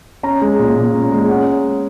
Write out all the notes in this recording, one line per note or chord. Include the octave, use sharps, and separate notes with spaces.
C#4 A#5
G#3
A#2
A#2
C#4
G#3
C#4 F#5